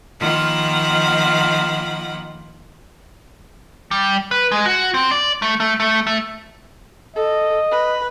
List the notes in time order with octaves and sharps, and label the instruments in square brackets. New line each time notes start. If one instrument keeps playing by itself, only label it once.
[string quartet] D#3 F3 A#3 F4 F#5 B5
[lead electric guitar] G3
B4
G#3
F#4
C4
D5
A3
A3
A3
A3
[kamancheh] A4 [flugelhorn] D#5
[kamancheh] B4